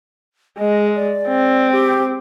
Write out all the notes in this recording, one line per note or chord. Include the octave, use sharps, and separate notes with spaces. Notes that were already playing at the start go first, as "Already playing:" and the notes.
G#3 D#5
D5
C4
G4